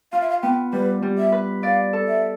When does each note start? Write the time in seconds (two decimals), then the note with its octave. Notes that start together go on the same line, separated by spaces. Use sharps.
0.12 F4 F5
0.21 E5
0.29 F5
0.43 B3 G5
0.72 G3 B4
1.02 G3
1.18 E5
1.32 B4
1.63 D5 F5
1.93 A4
2.08 E5